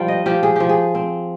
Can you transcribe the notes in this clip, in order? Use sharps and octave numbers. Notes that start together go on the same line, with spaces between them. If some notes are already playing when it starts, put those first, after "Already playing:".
Already playing: F3 G3 G5
D#5
F3 G4
G#4
F3 G4
G#4
C4